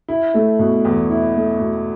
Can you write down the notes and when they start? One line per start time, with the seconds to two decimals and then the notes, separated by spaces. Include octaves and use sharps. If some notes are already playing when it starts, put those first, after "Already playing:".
0.08 E4
0.34 A3
0.59 B2
0.85 E2
1.10 E4
1.36 A3
1.60 B2